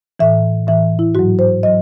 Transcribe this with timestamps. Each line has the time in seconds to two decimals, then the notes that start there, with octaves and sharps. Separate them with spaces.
0.19 A2 E3 E5
0.67 A2 E3 E5
0.99 E4
1.15 G#2 F#3 F#4
1.39 C5
1.63 F#3 D#5